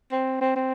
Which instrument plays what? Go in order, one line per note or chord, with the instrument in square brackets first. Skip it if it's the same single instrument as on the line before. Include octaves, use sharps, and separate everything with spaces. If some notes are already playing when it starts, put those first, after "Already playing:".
[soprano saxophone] C4
C4
C4